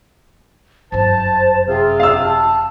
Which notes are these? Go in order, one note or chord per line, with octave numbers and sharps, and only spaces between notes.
G1 F#2 C5 A5
C3 C4 F4 G#4
F5 E6
A5